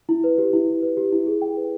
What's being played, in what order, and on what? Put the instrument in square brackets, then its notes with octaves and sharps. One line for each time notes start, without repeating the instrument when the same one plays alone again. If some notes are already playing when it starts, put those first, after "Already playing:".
[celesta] E4
B4
G4
E4
E4
B4
G4
E4
G#4
G5
B4